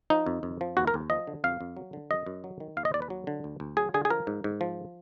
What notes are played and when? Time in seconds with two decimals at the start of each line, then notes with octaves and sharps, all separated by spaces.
0.10 F3 D#4
0.26 F2
0.43 F2
0.61 F3
0.77 D#2 F#4
0.87 A#4
0.94 D#2
1.10 F3 D#5
1.27 D3
1.44 F2 F5
1.61 F2
1.77 F#3
1.93 D3
2.11 F#2 D#5
2.26 F#2
2.44 F#3
2.60 D#3
2.77 D#2 F5
2.85 D#5
2.94 D#2 D5
3.02 B4
3.10 F#3
3.27 D3
3.44 D2
3.60 D2
3.77 F#3 G#4
3.94 D3 G#4
4.05 G#4
4.10 F3 A#4
4.27 G#2
4.44 G#2
4.61 F3